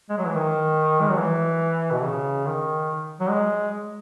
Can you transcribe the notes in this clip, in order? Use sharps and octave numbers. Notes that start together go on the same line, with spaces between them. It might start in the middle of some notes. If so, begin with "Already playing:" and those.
G#3
F#3
E3
D#3
G#3
F#3
E3
B2
C#3
D#3
F#3
G#3